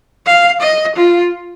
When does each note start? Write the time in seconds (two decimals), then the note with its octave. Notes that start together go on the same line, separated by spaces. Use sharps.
0.26 F5
0.62 D#5
0.96 F4